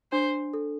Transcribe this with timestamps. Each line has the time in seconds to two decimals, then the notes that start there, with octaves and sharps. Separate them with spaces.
0.12 D4 C5
0.54 A4